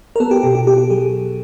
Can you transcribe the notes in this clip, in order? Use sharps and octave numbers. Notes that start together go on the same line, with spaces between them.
A#4
B3 A4
G4
B2 G4
G4
B3 G4
G4
F#3 G#4